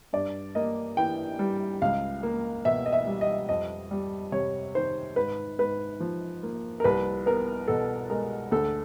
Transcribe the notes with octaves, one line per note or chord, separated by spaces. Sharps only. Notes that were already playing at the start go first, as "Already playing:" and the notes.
G2 D5
A#3 D#5
E3 G5
G3
C#2 F5
A#3
B2 E5
D#5
E5
G3
D#5
F2 D#5
G3
C3 C#5
D#3 C5
G#2 B4
G#2 B4
F3
A#3
A#4
C2 B4
B3 A#4
B2 A4
G#3 A#4
D2 A4